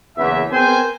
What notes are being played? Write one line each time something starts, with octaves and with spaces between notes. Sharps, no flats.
F#1 E2 E3 C#4 E5
B3 C4 G#4 A#4 C5 G#5